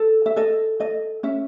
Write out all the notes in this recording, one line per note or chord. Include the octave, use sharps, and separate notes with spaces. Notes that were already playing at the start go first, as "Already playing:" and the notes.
Already playing: A4
E5
A4 D#5
A4 D#5
C#4 E5